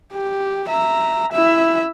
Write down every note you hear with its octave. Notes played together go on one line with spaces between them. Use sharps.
G4
E5 A#5
E4 E5